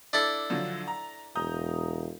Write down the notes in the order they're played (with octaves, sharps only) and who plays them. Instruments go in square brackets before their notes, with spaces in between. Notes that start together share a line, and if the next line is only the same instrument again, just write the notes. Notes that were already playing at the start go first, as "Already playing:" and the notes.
[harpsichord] D4 E4 A4 [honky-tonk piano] D6
[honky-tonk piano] D3 F3 F#3
A#5
[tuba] E1 [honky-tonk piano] A#5 D#6 G6